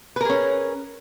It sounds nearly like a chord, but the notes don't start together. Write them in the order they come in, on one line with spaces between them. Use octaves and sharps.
B4 A#4 G#4 C#4